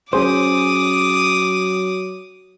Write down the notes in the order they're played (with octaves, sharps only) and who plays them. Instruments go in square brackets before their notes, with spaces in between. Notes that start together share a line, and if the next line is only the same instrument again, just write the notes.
[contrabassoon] F#3 [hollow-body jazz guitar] C#4 G#4 C5 [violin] D6 D#6